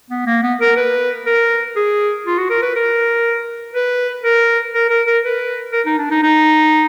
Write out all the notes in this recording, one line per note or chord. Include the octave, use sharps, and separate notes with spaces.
B3
A#3
B3
A#4
B4
A#4
G#4
F4
F#4
A#4
B4
A#4
B4
A#4
A#4
A#4
A#4
B4
A#4
D#4
D4
D#4
D#4